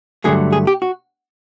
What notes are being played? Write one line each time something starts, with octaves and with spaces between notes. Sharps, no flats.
G2 D3 F#3 A3 G#4
G#4
G4
F#4